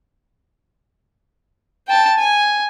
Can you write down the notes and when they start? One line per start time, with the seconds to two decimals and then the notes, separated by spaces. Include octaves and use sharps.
1.88 G5 A5
2.19 G#5